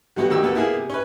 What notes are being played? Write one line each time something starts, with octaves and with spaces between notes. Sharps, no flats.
D3 F#3 B3 F#4 G4
D2 D#3 G4 E6
D2 A#3 B3 A4
A#3 B3 E4 F4 G#4
C3
C#4 B4